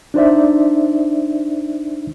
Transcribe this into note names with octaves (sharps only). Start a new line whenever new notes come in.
D4 D#4 C5 D5 E5